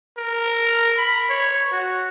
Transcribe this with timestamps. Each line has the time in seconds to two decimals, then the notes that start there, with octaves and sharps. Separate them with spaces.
0.18 A#4
0.98 B5
1.29 C#5
1.72 F#4